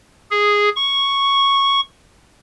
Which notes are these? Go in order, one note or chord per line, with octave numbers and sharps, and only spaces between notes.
G#4
C#6